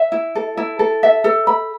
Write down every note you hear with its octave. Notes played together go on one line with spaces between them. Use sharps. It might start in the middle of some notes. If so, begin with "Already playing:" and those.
Already playing: E5
E4
A4
E4
A4
E5
A4
B5